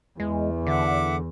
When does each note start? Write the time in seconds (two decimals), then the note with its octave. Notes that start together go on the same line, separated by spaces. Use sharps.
0.20 E2 E3 G#3
0.67 D3 E5 F#5 D6